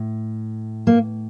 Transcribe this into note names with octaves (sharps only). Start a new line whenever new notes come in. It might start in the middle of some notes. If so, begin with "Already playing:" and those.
Already playing: A2
A#3